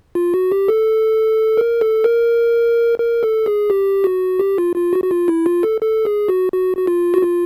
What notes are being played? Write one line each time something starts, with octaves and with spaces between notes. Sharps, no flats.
F4
F#4
G4
A4
A#4
A4
A#4
A#4
A4
G#4
G4
F#4
G4
F4
F4
F#4
F#4
F4
E4
F4
A4
A4
G#4
F#4
F#4
F#4
F4
F#4
F4